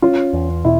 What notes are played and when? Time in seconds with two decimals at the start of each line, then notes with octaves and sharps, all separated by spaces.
0.02 C#4 F4
0.33 E2
0.65 B2 E4